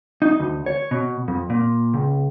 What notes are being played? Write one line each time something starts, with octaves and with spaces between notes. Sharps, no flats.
D#4
D2
C#5
B2
F2
A#2
C#2